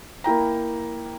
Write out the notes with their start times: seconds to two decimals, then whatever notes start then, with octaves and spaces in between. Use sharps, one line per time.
0.24 A#3 E4 G5 A#5